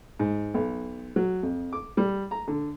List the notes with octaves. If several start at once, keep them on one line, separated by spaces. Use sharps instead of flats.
G#2
B1
F#3
F2
D6
G3
A#5
D3